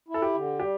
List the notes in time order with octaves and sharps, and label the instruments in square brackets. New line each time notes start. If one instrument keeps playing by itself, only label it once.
[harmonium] E4
[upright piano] A4
G4
[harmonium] D3
[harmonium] G3 [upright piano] G4